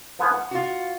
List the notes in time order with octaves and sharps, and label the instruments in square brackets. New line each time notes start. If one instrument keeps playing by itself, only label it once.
[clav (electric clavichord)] F3 B3 G#5
F#5
[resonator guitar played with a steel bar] F4 F#4